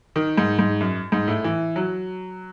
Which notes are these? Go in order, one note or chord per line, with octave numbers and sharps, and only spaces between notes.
D#3
G#2
G#2
F#2
G#2
A2
E3
F#3